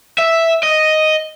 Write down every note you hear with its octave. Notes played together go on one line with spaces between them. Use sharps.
E5
D#5